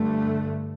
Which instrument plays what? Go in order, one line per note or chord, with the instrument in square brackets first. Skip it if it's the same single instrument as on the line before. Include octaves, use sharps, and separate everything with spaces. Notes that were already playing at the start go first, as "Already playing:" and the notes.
Already playing: [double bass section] G2 D3 A3